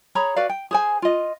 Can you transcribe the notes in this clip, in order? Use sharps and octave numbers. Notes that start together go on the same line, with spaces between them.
G#4 C#5 A#5 B5
F#4 B4 D5 F5
G5
G#4 C5 G#5
F4 D#5